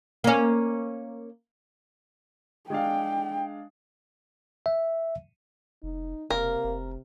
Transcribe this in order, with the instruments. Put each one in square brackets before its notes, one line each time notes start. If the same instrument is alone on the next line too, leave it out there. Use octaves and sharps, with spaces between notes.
[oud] A#3 C#4
[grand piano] G#3 D4 F5 [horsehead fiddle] G5
[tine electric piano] E5
[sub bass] F1 [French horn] D#4
[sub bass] E1 [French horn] C3 [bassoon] A#3 [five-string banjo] A#4
[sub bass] F1